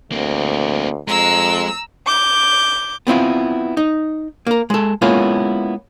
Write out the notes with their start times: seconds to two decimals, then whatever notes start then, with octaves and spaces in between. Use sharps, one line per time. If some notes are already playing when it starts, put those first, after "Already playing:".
0.12 D2 A#3 C4
1.08 F2 G#3 A#5 E6
2.07 D6 G6
3.07 B3 C4 E4 F4
3.77 D#4
4.47 A#3 A#4
4.70 G#3 A4
5.02 G#3 A#3 B3 C#4 E4 F4